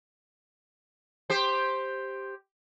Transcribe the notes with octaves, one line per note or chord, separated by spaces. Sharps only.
G4 C5